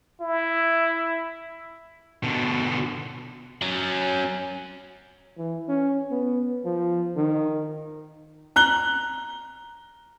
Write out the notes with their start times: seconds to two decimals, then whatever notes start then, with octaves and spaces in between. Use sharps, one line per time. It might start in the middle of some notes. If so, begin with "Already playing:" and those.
0.21 E4
2.23 B2 D3
3.61 F#3 C#4
5.38 E3
5.68 C#4
6.11 B3
6.65 F3
7.16 D#3
8.56 A#5 F#6 G7